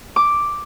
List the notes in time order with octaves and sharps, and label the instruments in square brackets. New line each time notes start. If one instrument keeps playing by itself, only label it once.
[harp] D6